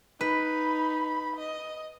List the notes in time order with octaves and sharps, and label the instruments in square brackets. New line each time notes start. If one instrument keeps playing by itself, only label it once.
[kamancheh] D#4 B5 [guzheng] B4
[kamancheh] D#5